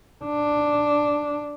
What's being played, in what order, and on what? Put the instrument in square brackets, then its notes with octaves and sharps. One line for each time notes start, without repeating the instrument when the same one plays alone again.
[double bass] D4